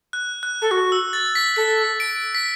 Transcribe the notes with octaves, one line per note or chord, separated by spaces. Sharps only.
F#6
F#6
A4
F#4 F#6
E6
A6
B6
A4 B6
D7
B6